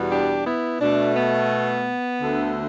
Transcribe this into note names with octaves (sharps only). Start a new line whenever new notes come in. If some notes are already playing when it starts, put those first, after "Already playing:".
Already playing: E2 B2 G3 B3
D4 G4
B3 E4
B2 A3 D4
B3
D2 D3 A3